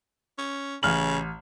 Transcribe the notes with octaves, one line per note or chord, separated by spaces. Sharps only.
C#4
A1 C#3 F6 F#7